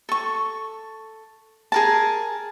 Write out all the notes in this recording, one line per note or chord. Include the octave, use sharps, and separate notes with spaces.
A4 C#6
G#4 A#4 A5